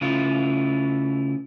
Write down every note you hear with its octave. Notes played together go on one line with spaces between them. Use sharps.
C#3 A3 E4 F4